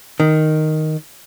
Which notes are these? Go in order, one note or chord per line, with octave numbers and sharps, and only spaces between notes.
D#3